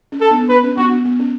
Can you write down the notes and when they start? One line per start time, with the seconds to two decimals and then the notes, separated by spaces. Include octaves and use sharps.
0.12 C#4
0.21 A4
0.31 B3 D4
0.49 B3 D4 B4
0.64 C#4
0.77 B3 D4 F#4
0.91 B3 D4
1.05 B3
1.20 C#4